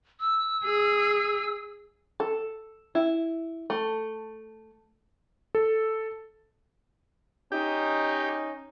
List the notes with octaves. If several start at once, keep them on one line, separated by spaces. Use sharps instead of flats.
E6
G#4
A4
E4
A3
A4
C#4 D#4 G4